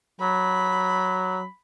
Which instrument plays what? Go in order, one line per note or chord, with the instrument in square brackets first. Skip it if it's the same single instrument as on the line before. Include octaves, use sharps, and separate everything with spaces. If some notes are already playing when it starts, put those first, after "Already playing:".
[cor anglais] F#3 [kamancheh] B5